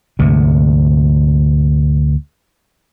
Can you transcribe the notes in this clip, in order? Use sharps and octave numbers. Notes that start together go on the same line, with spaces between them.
D2 G#2 C3